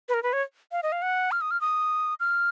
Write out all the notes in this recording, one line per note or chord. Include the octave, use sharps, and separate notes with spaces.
B4
A#4
B4
C#5
F5
D#5
F5
F#5
F6
D#6
F6
D#6
F6